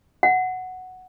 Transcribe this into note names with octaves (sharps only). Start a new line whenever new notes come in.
F#5